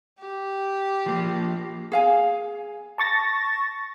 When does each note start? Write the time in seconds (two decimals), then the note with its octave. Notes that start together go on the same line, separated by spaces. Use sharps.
0.19 G4
1.06 F3 A#3
1.92 G#4 F5 G#5
2.98 A5 C#6 A6 A#6